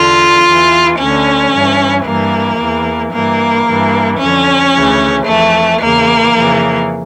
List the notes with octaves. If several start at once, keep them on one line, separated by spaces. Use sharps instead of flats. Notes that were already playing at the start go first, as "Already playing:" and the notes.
Already playing: E2 D3 F4
E2 E3
D2 D3 C#4
G2 E3
G2 E3 A#3
E2 E3
G2 E3 A#3
G2 E3
F2 D3 C#4
D2 C#3 E3
F2 E3 A3
E2 C#3 E3 A#3
F2 C#3 E3